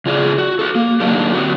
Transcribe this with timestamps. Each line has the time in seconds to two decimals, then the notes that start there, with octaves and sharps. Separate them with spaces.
0.06 C#3 F4 G#4 D5
0.38 F#4
0.59 F#4 A4
0.75 A#3
1.00 F#3 A#3 D4 D#4 G4
1.34 D3 C4 F#4